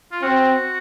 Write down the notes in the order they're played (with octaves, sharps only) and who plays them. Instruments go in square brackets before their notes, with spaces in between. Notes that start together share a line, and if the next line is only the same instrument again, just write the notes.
[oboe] F4
[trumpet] C4 [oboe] F#4